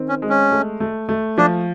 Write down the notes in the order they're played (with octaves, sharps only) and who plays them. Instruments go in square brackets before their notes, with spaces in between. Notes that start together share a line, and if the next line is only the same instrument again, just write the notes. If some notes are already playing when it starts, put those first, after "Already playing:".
Already playing: [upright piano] D#3 C4
[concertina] C#4
[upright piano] G#3
[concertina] C#4
[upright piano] A3
A3
A3
[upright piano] F3 [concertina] D4